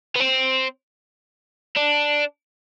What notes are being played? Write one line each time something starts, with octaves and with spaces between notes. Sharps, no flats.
B3
C4
D4